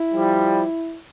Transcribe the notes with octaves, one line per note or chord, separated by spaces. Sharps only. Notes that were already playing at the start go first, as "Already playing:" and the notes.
Already playing: E4
F3 G3